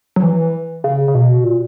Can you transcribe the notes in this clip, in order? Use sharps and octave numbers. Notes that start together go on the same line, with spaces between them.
F#3
E3
C#3
C#3
B2
A#2